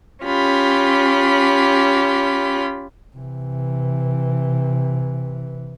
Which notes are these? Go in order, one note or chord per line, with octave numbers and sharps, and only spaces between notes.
C#4 F4 G4 B5
C3 E3